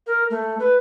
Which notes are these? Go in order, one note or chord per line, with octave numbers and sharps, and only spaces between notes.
A#4
A3
B4